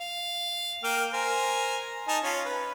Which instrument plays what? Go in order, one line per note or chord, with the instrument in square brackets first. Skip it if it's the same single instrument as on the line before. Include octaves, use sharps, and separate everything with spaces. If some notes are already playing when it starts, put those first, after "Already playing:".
[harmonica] F5
A#3 G5 F6
A#4 C5 G#5
D#4 G#5 A5
C#4 F4
B4